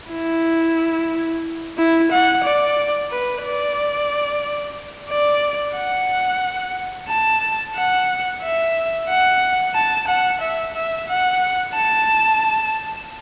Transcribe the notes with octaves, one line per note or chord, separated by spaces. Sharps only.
E4
E4
F#5
D5
B4
D5
D5
F#5
A5
F#5
E5
F#5
A5
F#5
E5
E5
F#5
A5